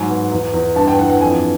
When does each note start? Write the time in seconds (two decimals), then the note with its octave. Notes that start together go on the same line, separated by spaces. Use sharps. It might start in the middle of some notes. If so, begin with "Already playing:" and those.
Already playing: G#2 F#3 G#5
0.09 B3
0.32 E2
0.54 E2
0.75 G2 A5
0.88 G5
0.99 E3 F#5
1.10 F#5
1.21 F2 G#5